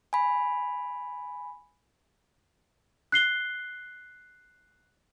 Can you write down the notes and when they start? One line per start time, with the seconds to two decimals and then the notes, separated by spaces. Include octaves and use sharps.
0.13 G#5 B5
3.12 F#6 C7 G7